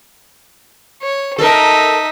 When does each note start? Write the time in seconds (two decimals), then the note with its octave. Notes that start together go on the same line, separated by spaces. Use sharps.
1.02 C#5
1.38 D#4 A4 A#4 E5